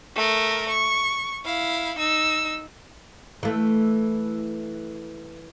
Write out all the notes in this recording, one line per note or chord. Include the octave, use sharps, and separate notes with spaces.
A3 A#4
C#6
E4 F5
D#4 E6
E3 A3